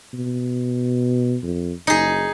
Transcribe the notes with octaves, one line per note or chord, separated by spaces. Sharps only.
B2
F2
F#1 D#4 G#4